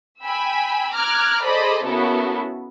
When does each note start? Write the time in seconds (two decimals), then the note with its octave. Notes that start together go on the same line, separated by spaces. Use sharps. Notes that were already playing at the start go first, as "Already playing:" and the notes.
0.22 G5 G#5 B5 E6
0.93 A#5 D6 F6 F#6 G#6
1.45 G#4 A4 C5 D5 D#5 B5
1.85 C#3 B3 E4 F#4 A4 A#4